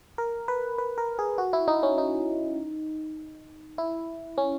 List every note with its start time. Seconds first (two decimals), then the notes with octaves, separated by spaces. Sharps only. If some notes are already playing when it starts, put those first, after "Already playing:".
0.18 A#4
0.48 B4
0.78 B4
0.98 A#4
1.19 G#4
1.38 F#4
1.53 E4
1.68 D#4
1.83 C#4
1.98 D#4
3.78 E4
4.38 C#4